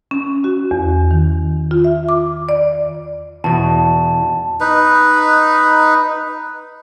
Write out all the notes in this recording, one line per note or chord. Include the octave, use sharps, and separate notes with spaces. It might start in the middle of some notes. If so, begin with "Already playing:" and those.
C#4
F#4
E2
D#3
F4
E5
D6
D5
E2 B2 A5
D#4 B4